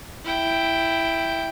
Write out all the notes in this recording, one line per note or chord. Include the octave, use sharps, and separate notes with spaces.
E4 G5